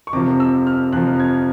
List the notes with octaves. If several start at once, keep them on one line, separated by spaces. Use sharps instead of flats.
C#6
F2 C3 F3 D6
E6
F6
F2 C3 F3 F#6
G#6